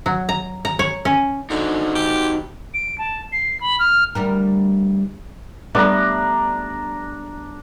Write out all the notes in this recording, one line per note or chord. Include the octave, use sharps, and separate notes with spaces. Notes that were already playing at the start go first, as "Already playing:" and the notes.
F#3
A#5
A#5
C#5
C#4
D3 D#4 F#4 C5
G4
D7
A5
C7
B5
F6
D2 G3 A#4
G3 A3 B3 D4 A#5